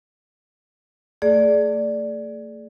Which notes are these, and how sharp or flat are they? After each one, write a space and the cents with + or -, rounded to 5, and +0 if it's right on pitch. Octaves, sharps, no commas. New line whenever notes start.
A3 +40 G#4 +30 D5 +0